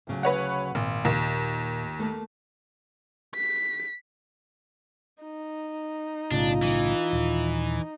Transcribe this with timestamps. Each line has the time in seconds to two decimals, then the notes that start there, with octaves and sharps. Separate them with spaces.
0.07 D2 C#3 F#3
0.23 B4 C#5 F#5
0.75 G#1 A#2
1.05 D#2 A#2
1.99 A3 A#3
3.35 B6
5.23 D#4
6.32 B1 A2 C#3 D4 F4
6.63 E3
7.13 D#1